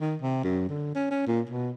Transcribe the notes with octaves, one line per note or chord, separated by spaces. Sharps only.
D#3
C3
F#2
D3
C#4
C#4
A#2
B2